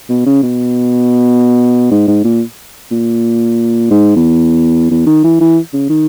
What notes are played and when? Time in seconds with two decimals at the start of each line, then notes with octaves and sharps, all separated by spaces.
0.09 B2
0.26 C#3
0.43 B2
1.91 G#2
2.08 G#2
2.24 A#2
2.91 A#2
3.90 G#2
4.16 E2
4.91 E2
5.07 D#3
5.24 E3
5.41 E3
5.73 C#3
5.90 D#3